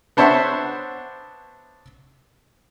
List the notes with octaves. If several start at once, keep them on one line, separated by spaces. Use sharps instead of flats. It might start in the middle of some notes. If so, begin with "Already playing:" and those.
B3 D4 C5 C#5 E5 F#5